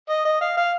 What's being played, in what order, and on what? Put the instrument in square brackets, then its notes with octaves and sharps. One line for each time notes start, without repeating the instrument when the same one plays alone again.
[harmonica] D#5
D#5
F5
F5